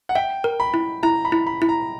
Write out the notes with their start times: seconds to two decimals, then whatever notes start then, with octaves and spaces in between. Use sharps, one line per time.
0.09 F#5
0.15 E5 G5
0.44 A#4
0.60 B5
0.74 E4
1.03 E4 A#5
1.25 B5
1.32 E4
1.47 B5
1.62 E4
1.69 A#5